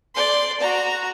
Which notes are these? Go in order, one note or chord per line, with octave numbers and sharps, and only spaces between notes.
D5 C6
F#4 A#5